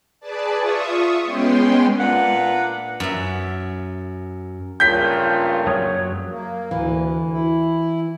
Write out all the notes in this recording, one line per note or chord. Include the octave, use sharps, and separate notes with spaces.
G#4 B4 D5 A5
F4 E5 C#6 D#6
G#3 B3 C#4 G5 C6
A#2 A#3 D4 B4 F#5
F#2 E5
G2 C#3 A3 A#3 F4 G6 B6
F#2 F#3 C#5 D#6
A#3
D2 E3
E4